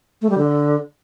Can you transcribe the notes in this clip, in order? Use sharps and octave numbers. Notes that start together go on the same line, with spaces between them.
A3
G3
D3